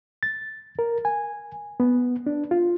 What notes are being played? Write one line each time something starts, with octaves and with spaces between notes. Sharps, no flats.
A6
A#4
G#5
B3
D4
F4